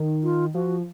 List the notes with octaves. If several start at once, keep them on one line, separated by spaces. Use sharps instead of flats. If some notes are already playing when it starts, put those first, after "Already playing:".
Already playing: D#3
F4
F3 F#4